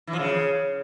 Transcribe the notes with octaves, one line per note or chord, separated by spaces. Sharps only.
E3
F3
C#3